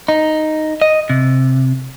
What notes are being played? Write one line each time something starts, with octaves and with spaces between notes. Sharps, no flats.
D#4
D#5
C3